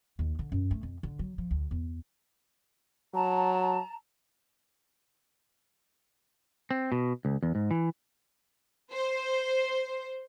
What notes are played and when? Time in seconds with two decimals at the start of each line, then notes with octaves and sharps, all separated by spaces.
0.19 D#2
0.39 D3
0.52 F#2
0.71 A3
0.83 F2
1.03 D3
1.19 F#3
1.38 F3
1.51 D2
1.71 E2
3.14 F#3 A5 A#5
6.71 C4
6.92 B2
7.25 C#2
7.43 E2
7.55 G#2
7.71 E3
8.92 C5